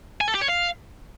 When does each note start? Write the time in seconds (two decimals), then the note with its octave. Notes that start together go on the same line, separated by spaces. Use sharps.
0.21 G#5
0.28 A4
0.35 G4
0.42 C#5
0.49 F5